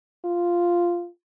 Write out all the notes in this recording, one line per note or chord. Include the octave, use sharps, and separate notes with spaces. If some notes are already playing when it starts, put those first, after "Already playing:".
F4